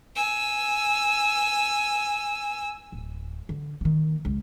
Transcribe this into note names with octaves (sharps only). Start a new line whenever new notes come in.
G#5 E6
D1
D3
D#3 A#3
C#2 C#3